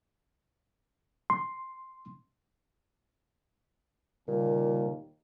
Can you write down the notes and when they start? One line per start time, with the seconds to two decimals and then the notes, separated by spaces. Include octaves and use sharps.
1.30 C6
4.28 D#2 A#2 C#3 G3 A#4